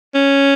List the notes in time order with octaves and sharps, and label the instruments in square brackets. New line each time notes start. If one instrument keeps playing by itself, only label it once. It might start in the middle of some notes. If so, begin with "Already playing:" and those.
[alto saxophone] C#4